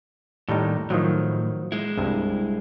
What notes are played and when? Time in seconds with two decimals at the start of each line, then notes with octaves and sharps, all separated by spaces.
0.49 D#2 A2 G3 D#4
0.90 A2 D#3 F3 F#3
1.72 G#3 E4
1.97 C2 G2